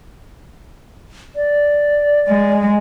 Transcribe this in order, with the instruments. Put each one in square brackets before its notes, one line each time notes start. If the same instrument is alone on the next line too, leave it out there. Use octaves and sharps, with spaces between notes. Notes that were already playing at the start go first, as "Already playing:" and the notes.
[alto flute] D5
[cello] G#3